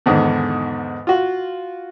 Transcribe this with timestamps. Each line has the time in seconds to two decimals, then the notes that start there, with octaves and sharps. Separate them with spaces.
0.06 E2 G#2 D3 D#3
1.07 F4 F#4